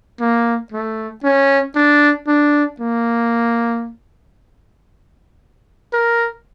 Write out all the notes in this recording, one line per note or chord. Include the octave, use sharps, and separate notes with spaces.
A#3
A3
C#4
D4
D4
A#3
A#4